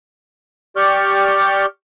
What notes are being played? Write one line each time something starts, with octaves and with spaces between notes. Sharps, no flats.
G4 D5 C#6 F6 G6